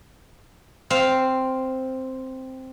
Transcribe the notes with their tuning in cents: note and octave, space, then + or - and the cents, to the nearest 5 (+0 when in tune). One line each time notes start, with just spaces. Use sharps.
C4 +0 F5 +0